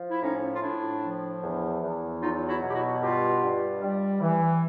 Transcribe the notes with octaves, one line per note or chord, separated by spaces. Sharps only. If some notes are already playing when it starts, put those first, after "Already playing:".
Already playing: F3
E4
A2 C#4 D#4
F4
A2 D4 E4
F3
E2
E2
F#3 D#4 F4
E4 F#4
B2
G4
E4 F#4
G2 F4 G4
G2
G3
E3